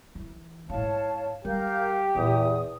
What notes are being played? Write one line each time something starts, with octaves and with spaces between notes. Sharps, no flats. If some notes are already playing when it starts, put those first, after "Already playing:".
E3
G#2 E4 C#5 F5 A5
G3 G4 A#4 F5 G6
E2 A#2 D#6